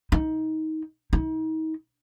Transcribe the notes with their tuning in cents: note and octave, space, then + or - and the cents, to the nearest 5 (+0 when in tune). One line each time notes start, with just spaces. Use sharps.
D#4 +20
D#4 +35